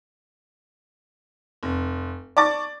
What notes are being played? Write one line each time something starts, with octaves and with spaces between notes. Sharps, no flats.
F1
D5 A5 C#6 D6 A6